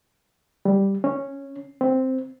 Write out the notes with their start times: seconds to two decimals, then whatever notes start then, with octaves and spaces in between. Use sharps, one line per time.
0.65 G3
1.04 C#4
1.81 C4